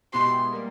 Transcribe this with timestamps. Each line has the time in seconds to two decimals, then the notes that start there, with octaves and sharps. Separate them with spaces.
0.13 B2 G#3 B3 E4 G4 C6
0.53 G3 A#3